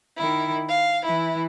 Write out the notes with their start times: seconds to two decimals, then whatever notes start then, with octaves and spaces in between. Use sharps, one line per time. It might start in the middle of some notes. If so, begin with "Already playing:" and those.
0.17 D#3 E4
0.69 F5
1.04 E3 E4